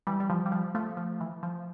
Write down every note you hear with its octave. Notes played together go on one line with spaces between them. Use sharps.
E3 G3
G3
F3
G3
F3
F3 A3
F3
E3
F3